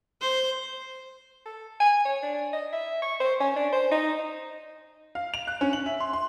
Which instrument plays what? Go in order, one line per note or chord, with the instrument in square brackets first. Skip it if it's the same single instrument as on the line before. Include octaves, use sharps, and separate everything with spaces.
[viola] C5
[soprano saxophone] A4
G#5
C#5
D4
D#5
E5
C#6
C5
C#4
D4
C5
D#4
[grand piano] F5
F7
F#6
C#4
F#7
E5
C6
C6